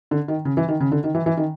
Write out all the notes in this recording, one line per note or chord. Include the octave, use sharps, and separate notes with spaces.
D3
D#3
C#3
E3
D#3
C#3
D3
D#3
E3
E3
D#3